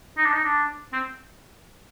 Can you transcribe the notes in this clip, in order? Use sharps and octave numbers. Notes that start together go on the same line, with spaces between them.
D#4
D4
D#4
D4
C4